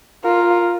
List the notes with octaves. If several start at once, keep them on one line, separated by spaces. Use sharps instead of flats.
F4 A#4